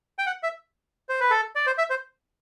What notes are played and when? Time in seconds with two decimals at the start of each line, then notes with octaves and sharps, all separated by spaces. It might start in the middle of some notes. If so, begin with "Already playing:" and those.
0.19 G5
0.26 F#5
0.43 E5
1.09 C5
1.20 B4
1.30 A4
1.55 D5
1.66 C5
1.78 E5
1.90 C5